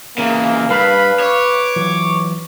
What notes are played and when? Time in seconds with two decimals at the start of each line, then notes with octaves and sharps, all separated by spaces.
0.18 C#3 E3 A#3
0.70 G2 B4 F5 B5 F6
1.20 C#5 D6
1.76 E3 F#3